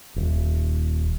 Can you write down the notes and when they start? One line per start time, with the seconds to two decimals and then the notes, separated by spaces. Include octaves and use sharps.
0.16 D#1